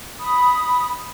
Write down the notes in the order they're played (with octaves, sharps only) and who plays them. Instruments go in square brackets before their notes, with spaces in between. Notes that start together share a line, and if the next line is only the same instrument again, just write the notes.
[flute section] B5 D#6